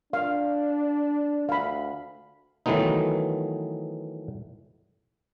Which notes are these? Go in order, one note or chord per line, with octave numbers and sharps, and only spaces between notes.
D4 F5
D2 F5 B5
D#3 E3 F#3 A3 B3 D#4